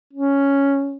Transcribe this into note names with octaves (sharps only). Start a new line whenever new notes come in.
C#4